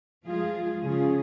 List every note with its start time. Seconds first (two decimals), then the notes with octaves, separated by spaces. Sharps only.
0.24 F3 G#3 F4 G#4
0.82 C#3 F3 C#4 F4 G#4